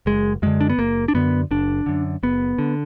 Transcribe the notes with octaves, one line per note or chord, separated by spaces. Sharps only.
F#1 G#3
F#2 D3 G#3
D4
B3
F#1 A#3
D4
F#2 D3 B3
F#1 D4
F#2 D3
F#1 B3
D3